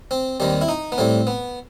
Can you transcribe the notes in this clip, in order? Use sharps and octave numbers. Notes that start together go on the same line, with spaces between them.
C4
D#2 D#3 G3 C4
E4
D#4
B3
A2 G3 C4
B3